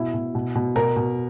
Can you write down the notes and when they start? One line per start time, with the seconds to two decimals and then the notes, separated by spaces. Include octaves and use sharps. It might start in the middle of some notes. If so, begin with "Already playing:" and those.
Already playing: B2 E4
0.14 B2
0.35 B2
0.55 B2
0.76 B2 A#4
0.96 B2